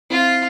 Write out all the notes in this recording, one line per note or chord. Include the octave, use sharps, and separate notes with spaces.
C4 E4 F4